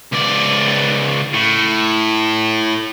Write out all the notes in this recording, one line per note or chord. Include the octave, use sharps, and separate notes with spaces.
C#2 D5
A2